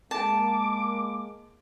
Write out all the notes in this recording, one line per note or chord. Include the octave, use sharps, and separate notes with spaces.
G#3 A#3 A5 D6